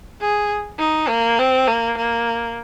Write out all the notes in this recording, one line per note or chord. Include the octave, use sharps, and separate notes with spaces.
G#4
D#4
A#3
C4
A#3
A#3